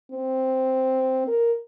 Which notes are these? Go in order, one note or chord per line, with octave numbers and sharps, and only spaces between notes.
C4
A#4